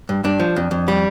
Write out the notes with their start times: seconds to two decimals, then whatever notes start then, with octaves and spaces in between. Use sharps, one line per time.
0.09 G2
0.24 G2 D4
0.40 F3
0.56 F2
0.71 F2
0.88 G3